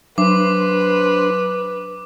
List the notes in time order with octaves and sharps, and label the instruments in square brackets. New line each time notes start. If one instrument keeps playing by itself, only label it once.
[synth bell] F#3 [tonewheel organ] D4 C5 C6 [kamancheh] B4 [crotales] D6